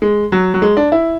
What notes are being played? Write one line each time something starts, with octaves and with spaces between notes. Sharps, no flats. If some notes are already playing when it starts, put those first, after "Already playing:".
G#3
F#3
F#3
G#3
D4
E4